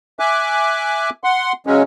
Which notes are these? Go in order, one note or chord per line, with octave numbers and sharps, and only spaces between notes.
E5 G#5 D6 F#6
F#5 C6
C#3 F#3 G#3 C#4